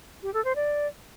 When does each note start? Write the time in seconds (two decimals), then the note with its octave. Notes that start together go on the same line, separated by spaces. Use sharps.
0.23 G4
0.34 A4
0.45 C5
0.56 D5